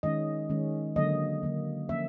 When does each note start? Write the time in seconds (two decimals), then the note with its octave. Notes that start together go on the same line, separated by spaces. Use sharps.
0.03 D#3 G#3 C#4 D#5
0.49 D#3 G#3 C#4
0.96 D3 F#3 A#3 D#5
1.43 D3 F#3 A#3
1.89 F3 A#3 C#4 E5